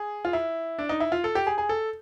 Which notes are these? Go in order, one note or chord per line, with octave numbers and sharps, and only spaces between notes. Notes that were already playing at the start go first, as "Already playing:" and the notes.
Already playing: G#4
F4
E4
D4
D#4
E4
F4
A4
G4
G#4
G#4
A4